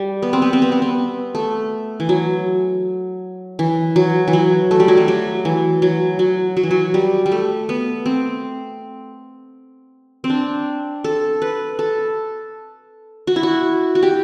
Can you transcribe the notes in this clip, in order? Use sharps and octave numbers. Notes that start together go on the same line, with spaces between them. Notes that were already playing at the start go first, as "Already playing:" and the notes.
Already playing: G3
B3
C4
B3
C4
B3
C4
B3
A3
E3
F#3
E3
F#3
E3
F#3
A3
G3
F#3
G3
F#3
E3
F#3
F#3
F#3
E3
F#3
G3
G3
A3
B3
C4
C4
D4
A4
B4
A4
F#4
E4
F#4
F#4
G4